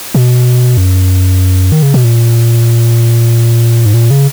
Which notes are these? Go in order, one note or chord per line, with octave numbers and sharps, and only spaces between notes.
B2
F#2
D#3
C#3
B2
A#2
G#2
A#2
C#3